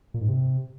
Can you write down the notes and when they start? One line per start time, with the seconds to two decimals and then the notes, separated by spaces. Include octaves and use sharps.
0.14 A#2
0.21 G#2
0.28 C3